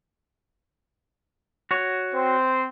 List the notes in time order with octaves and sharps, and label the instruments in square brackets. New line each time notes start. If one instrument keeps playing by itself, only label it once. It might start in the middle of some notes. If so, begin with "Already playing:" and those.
[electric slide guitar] F#4 C#5
[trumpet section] C4 C5